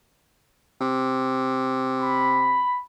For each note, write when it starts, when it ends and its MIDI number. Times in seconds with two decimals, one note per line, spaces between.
0.81 2.64 48
2.00 2.80 83